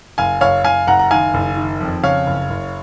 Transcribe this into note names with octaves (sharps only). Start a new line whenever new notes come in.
F#1 F5 G#5
F#1 C#5 F5
F#1 F5 G#5
F#1 F#5 A#5
A#5
D#3 F5 G#5
F#1
D#3
F2
C#3 C#5 F5
F#1
F#1